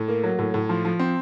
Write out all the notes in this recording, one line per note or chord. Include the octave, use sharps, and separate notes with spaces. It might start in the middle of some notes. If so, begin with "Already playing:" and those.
Already playing: A2
A#3
F#3
A2
A2
F3
F3
C4